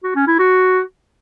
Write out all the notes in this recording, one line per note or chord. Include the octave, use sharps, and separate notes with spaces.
F#4
C#4
E4
F#4